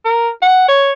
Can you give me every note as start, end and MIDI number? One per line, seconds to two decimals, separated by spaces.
0.05 0.29 70
0.42 0.64 78
0.68 0.92 73